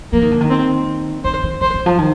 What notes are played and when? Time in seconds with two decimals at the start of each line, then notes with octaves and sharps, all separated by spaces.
0.13 F3 A#3
0.22 D#3
0.31 D3
0.41 D#3
0.50 C4
1.24 D#3 C5
1.43 D#3
1.61 D#3 C5
1.74 D3
1.86 F3
1.98 D#3